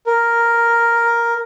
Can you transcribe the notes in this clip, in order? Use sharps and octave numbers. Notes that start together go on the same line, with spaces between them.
A#4